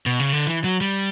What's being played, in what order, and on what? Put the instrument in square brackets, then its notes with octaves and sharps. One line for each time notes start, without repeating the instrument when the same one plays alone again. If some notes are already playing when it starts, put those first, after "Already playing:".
[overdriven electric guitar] B2
C#3
D3
E3
F#3
G3